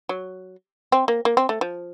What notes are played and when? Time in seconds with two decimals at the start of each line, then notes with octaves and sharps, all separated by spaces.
0.09 F#3
0.92 C4
1.08 A#3
1.25 A#3
1.37 C4
1.49 A3
1.61 F3